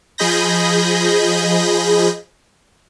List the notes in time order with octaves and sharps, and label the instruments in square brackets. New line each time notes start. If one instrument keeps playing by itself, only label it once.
[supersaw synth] F3 G#4 D#5 B5 G6 A#6